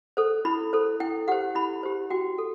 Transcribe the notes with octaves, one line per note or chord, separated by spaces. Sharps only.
A4 C5
E4 B5
A4 C5
E4 G5
G4 C5 F#5
E4 B5
G4 C5
F#4 G5
A4